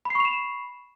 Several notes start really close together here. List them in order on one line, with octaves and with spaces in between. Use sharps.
B5 C7 C#6 F7 E7